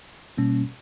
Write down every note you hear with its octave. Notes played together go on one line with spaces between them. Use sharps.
B2 G3 A#3 C#4